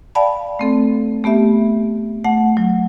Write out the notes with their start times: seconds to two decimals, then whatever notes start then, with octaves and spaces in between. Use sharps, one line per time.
0.15 D5 F5 G5 A5 B5
0.59 A3 C4 A4
1.24 A3 B3 G4 E5
2.25 A3 F#5
2.57 F#3